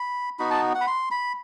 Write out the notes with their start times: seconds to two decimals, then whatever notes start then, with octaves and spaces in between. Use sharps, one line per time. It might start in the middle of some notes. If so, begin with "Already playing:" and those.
Already playing: B5
0.39 B3 D#4 F#4 B5
0.50 A5
0.75 F#5
0.81 B5
0.87 C6
1.11 B5